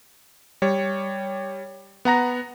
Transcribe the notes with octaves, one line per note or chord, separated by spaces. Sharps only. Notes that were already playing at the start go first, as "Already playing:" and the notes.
G3 C#5
B3 F#5 A#5 A#6